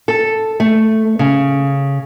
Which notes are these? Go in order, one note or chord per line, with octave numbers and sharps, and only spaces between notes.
A4
A3
C#3